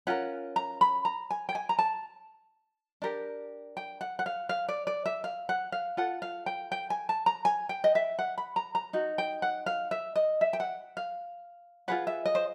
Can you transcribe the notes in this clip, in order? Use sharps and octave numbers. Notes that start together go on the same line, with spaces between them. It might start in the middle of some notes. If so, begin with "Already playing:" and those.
C#4 F4 A#4 F#5
A#5
B5
A#5
G#5
G5
G#5
A#5
A5
D4 G4 A#4
G5
F#5
F#5
F5
F5
D5
D5
E5
F5
F#5
F5
F4 A4 F#5
F5
G5
G5
G#5
A5
A#5
G#5
G5
D#5
E5
F#5
B5
A#5
A#5
D#4 F#4
G5
F#5
F5
E5
D#5
E5
G5
F#5
F5
F4 G#4 B4 F#5
E5
D#5
C5